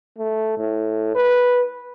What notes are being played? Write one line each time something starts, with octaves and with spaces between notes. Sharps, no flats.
A3
A2
B4